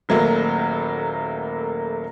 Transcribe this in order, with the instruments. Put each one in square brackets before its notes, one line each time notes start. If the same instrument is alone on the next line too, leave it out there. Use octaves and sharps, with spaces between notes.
[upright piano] D#1 F#3 A3 A#3 B4